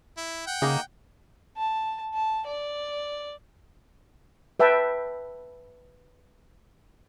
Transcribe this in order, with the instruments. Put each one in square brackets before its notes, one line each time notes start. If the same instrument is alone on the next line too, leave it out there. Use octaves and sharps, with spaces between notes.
[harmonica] E4
F#5 G5
[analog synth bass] C#3 [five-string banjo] A#3 D#4 G#4
[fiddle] A5
A5
D5
[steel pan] B4 E5 G5 A5